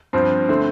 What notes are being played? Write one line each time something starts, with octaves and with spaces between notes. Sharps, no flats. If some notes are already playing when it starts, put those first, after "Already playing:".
G2 F3 C4
D3 A3 C4